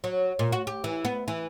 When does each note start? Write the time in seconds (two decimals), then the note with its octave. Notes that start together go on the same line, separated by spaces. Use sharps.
0.04 F#3
0.39 A#2
0.52 F#4
0.67 G4
0.84 E3
1.05 B3
1.28 E3